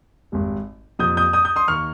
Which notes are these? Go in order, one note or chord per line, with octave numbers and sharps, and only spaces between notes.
G#1 G#2 G3
F2 C3 F3 A#3 D#6 G6
D#6 G6
D#6 G6
D#6 G6
C6 D#6
D#2 D#3 A#3 C#6 F6